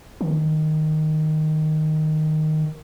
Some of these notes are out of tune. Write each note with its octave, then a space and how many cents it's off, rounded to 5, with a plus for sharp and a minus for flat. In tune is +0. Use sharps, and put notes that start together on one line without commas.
D#3 -5